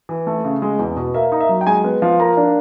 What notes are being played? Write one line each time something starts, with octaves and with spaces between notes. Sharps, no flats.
E3
A3
C#3
G#3
E2
B2
A#3 E5
D#4
E5
F#3
G5
G#3 G#5
B3
F3
A#3 A#5
D4